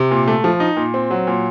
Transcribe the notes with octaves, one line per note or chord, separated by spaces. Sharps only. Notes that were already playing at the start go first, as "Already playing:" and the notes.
Already playing: C3
A#2
A3
F3
D#4
A#2
C4
F#3
A#2